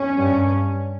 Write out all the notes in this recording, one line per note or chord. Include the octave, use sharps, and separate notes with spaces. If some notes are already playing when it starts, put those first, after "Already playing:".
Already playing: C#4
G2